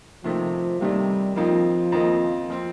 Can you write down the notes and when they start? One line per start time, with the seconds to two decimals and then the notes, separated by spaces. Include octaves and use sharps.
0.24 C3 D#3 F3 A3
0.80 C3 D#3 G3 A3
1.36 F2 D#3 F3 A#3 D#4
1.92 F2 D#3 A#3 D#4
2.50 F3 C4